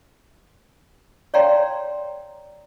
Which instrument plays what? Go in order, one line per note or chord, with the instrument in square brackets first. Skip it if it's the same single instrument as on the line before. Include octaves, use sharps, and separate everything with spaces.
[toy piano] C#5 D5 F5 G5 A#5 C6